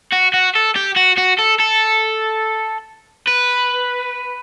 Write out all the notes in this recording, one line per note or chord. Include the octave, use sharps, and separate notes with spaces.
F#4
F#4
A4
G4
F#4
F#4
A4
A4
B4